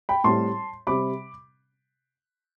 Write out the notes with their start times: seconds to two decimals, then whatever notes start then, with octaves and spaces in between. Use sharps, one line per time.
0.09 G5 B5
0.24 A2 G3 C4 A5 C6
0.87 C3 G3 C4 B5 D6